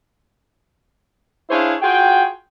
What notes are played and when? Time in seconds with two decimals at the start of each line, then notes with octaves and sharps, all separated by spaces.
1.50 D4 E4 G#4 C5 C#5 F5
1.82 F4 F#4 G#4 G5